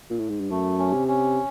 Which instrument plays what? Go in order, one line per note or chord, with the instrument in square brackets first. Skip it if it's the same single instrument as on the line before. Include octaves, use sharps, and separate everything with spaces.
[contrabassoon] A#2
A2
G#2
G2
[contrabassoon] F#2 [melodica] A3
[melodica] C#4
[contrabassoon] C3
[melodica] C#4